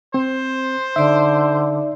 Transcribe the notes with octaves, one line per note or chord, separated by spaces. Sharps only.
C4 C5
D3 D#4 D5 E5